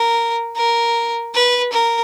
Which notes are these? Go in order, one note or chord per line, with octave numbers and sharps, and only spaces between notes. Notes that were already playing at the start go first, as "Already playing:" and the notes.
Already playing: A#4
A#4
B4
A#4